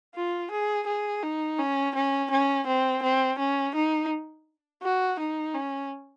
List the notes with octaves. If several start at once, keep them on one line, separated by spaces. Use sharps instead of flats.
F4
G#4
G#4
D#4
C#4
C#4
C#4
C4
C4
C#4
D#4
F#4
D#4
C#4